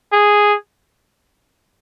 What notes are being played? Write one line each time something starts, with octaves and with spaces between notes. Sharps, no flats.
G#4